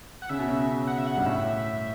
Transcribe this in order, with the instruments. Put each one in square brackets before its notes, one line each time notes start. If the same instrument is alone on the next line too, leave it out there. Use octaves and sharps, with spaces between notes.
[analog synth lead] F#5
[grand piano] C#3 [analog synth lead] E5
[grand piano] B2
C#3
[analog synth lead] F#5
E5
F#5
[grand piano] G2
[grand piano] A2 [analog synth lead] E5